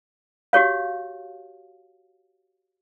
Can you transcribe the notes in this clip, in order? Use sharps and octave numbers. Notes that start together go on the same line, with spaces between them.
F#4 G4 C#5 F5